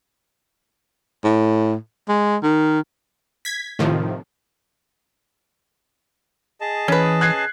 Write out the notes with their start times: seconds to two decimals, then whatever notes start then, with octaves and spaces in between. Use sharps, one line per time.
1.24 A2
2.08 G#3
2.43 D#3
3.45 G#6 B6
3.79 A2 C3 D#3 F3
6.61 G#4 D#5 A5
6.88 E3 C#4 B4
7.21 F#6 G#6 C7